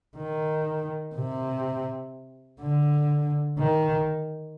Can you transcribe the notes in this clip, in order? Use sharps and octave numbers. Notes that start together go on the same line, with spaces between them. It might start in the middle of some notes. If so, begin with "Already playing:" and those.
D#3
C3
D3
D#3